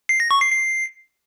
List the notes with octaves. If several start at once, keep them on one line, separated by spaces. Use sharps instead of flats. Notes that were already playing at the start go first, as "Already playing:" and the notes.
C7
A#6
C#6
C7
C7